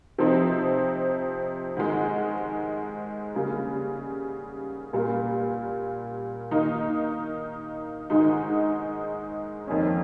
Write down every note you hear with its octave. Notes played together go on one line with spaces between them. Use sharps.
C3 F3 C4 D#4
G#2 D#3 G#3
C#3 G3 A#3
A#2 G3 A#3
D#3 A#3 D#4
G#2 D#3 G#3 D#4
F2 D#3 A#3 C#4